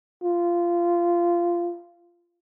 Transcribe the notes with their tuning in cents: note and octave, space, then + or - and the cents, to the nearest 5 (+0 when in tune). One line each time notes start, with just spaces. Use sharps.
F4 -15